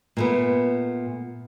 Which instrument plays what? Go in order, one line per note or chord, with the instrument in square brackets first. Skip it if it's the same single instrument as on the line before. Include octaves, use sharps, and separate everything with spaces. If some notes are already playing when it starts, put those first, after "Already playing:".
[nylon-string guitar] A#2 A3 B3